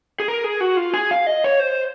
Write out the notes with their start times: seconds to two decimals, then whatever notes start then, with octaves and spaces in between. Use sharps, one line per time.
0.20 G#4
0.28 A#4
0.44 G#4
0.61 F#4
0.77 F4
0.94 G#4
1.11 F5
1.27 D#5
1.44 C#5
1.60 C5